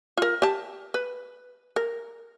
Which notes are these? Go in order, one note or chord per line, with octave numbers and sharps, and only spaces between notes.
F4 A#4
G4 A5
B4
A#4